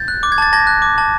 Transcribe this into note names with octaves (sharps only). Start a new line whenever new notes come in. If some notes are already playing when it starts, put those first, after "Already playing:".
Already playing: G6 A6
F#6
D6
G#6
A5 A6
A5 G#6 A#6
F#6
D6
A5